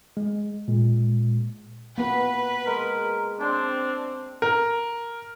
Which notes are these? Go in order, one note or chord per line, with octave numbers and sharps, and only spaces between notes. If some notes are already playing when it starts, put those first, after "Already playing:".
G#3
A#2 G#3
A#3 B3 B4
G#3 A#4
C4 D4 G5 A5 C6
A#4